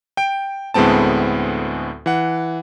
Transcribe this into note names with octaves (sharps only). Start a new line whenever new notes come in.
G5 D7
D2 A2 G#3 B3 C4 A5
E3 F#5